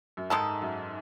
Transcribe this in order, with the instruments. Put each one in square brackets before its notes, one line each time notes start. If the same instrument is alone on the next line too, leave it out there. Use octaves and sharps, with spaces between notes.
[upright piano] F#2
[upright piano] G#2 [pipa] D#3 G#3 D#4 A4
[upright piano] F#2